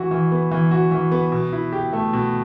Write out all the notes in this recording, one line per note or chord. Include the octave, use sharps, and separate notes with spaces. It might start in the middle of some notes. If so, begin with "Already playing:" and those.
Already playing: E3 F#4
E3
B3
E3
F#4
E3
B3
B2
E4
G4
A3
B2